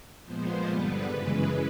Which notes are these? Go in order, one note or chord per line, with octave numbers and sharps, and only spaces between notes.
A#2 F3 G#3 B3 C5
G2 D3 G3 B3 B4
F#2 C#3 E3 G#3